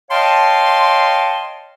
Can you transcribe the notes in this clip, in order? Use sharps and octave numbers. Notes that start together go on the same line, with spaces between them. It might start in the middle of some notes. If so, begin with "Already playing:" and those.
C#5 D#5 F5 G5 A5 C6